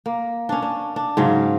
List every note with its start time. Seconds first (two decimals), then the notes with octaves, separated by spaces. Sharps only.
0.06 A#3
0.49 C#4 D4
0.62 D4
0.96 D4
1.17 G#2 C#3 F#3 F5